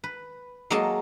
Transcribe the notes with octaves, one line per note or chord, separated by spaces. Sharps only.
B4
F#3 G#3 A#3 A4 D#5 A5